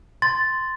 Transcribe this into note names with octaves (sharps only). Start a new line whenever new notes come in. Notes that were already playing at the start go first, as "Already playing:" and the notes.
C6 A6